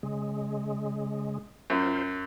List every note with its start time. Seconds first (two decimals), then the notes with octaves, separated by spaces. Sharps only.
0.03 C#3 G#3
1.70 F#2 F4 C5